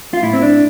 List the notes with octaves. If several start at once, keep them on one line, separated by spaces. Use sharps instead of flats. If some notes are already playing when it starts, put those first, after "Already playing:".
F4
A2 E4
C4
D4